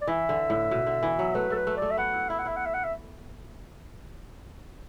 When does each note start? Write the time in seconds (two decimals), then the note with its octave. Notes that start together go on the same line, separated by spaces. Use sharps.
0.01 D5
0.07 E3 E5
0.29 D3
0.50 A2
0.71 B2
0.86 D3
1.03 E3
1.19 F#3
1.35 A3 B4
1.50 A3 A4
1.55 B4
1.67 A3
1.77 D5
1.82 A3
1.90 E5
1.97 B3 F#5
2.13 E4
2.29 E4 E5
2.39 F#5
2.45 E4 E5
2.57 F#5
2.66 E5
2.74 F#5
2.84 E5